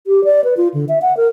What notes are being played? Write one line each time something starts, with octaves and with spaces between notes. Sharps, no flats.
G4
D5
B4
F4
D3
E5
F#5
A#4